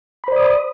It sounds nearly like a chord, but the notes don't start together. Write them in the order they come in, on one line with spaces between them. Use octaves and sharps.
B5 C5 D5 D#6